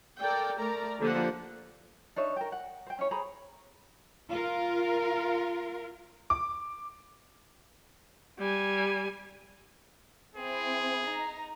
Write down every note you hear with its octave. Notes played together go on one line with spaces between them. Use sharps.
A4 A#4 D5 G5
A3 A#4 D5 A#5
D3 F3 A#3 G4 C5 F#5
D4 D#4 C#5 E5
A#4 G5
F#5
C5 G5
C#4 E4 C#5
G#4 C5 A#5 B5
F4 A#4
D6
G3 G#5
C4 E4 G#4
D#4 A#5